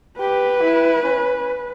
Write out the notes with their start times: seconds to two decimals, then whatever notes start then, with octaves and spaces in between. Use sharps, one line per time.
0.20 G4 B4
0.63 E4
1.05 C#4